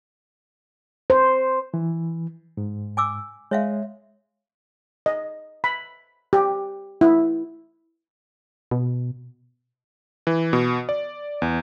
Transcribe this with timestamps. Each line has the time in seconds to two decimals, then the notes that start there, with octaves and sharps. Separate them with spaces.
1.10 C5
1.74 E3
2.57 G#2
2.97 G#5 D6 E6
3.51 G#3 C#5 E5 F5
5.06 D#5
5.64 B5
6.33 G4
7.01 E4
8.71 B2
10.27 E3
10.53 B2
10.89 D5
11.42 E2